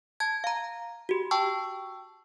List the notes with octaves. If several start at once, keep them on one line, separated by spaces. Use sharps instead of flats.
A5 G#6
F5 A#5
F#4 G4
G5 A5 C#6 E6